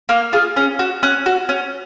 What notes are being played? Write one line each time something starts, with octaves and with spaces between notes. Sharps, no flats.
A#3 F6
F4 G#4
C#4
F#4
C#4 F#6
F#4
C#4